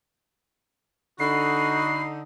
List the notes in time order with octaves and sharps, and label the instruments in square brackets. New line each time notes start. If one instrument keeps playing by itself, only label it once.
[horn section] D3 D#4 [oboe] F#4 [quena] B5 [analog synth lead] C7